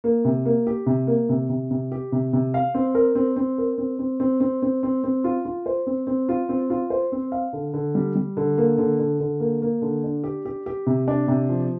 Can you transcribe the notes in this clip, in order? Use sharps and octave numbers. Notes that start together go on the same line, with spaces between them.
A#3
C3
A#3
G4
C3
A#3
C3
C3
C3
G4
C3
C3
F5
C4
A#4
C4
C4
A#4
C4
C4
C4
C4
C4
C4
C4
F4
F4
C5
C4
C4
F4
C4
F4
C5
C4
F5
D3
D3
G3
G3
D3
A#3
D3
D3
D3
A#3
A#3
D3
D4
G4
G4
G4
C3
D4
C3
F3